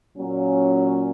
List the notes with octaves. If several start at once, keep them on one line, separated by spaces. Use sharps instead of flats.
A#2 F#3 C#4